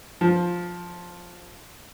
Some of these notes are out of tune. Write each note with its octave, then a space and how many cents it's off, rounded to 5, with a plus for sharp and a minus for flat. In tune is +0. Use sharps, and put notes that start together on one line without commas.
F3 +10